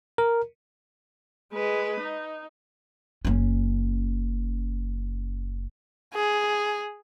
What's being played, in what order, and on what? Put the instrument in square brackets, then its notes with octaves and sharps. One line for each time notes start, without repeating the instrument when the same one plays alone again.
[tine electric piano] A#4
[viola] G#3 B4
D#4
[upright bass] F#1 C#4
[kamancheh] G#4